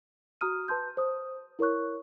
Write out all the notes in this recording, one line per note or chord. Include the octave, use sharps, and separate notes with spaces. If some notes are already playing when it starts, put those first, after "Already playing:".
F#4 A#5 D#6 F6 D#7
B4 A5 C6 G6
C5 D#6
E4 A#4 C#5 C#6 F#6